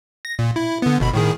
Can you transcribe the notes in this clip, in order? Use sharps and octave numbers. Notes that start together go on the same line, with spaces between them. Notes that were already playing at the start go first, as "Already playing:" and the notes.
A#6
A#2
E4
D3 B3
G1 B2 B5
A2 D#3 G#4